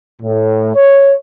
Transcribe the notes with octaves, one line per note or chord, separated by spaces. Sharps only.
A2
C#5